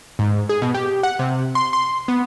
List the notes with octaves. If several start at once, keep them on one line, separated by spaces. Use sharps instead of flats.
G#2
G#4
B2
G4
F#5
C3
C6
C6
B3